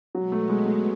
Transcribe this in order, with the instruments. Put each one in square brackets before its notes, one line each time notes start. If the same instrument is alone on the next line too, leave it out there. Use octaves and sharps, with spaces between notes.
[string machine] B2 G#3 B3 [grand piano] F#3
[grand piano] A3
G#3
A3